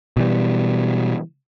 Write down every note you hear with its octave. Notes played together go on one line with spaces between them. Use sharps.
B2 E3 G3